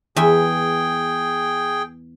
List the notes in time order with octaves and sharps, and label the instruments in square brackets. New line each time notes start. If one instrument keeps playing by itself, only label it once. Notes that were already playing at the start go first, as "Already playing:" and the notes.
[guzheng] E2 E5 G#5 [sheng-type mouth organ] G#4 G5